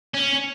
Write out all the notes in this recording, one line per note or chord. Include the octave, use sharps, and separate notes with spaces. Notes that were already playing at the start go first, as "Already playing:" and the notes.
C#4